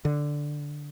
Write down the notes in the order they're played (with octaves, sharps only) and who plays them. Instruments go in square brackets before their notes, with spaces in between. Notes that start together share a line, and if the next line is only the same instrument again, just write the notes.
[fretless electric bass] D3